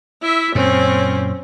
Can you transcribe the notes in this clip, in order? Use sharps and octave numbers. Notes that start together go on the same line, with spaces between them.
E4 E5
F#2 A#2 C4 C#4